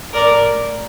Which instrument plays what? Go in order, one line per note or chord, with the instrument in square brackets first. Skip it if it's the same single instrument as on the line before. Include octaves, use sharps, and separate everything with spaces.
[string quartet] A2 A#4 D5